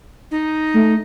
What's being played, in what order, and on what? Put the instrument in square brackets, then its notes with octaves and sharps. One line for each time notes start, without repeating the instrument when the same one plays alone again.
[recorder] D#4
[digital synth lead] A3